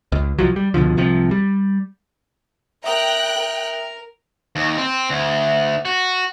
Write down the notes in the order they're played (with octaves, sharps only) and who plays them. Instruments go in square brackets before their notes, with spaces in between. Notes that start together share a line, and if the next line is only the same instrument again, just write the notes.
[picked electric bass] C#2
C2 F3 F#3
G3
C#2 B2 D3 F3
C2 C3 F3
G3
[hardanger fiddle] A#4 A#5 [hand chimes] E5 D#6 D7 [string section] G5 F#6
[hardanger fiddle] A#4
[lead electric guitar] D#2
C4
D2
F#4